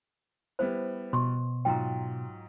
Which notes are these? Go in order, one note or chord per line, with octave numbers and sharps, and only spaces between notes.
G3 B3 E4 C5
B2 C6 C#6
G#2 F#3 F4 G5 A#5